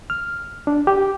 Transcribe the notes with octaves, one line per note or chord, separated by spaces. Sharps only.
F6
D4
G4